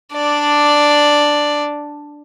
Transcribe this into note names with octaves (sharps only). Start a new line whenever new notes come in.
D4 D5